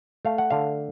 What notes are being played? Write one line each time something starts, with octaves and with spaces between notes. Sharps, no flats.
A3 F5
F#5
D3 F5